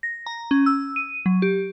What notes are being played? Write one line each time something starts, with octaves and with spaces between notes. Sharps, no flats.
A#6
A#5
C#4
E6
D#7
F#3
G4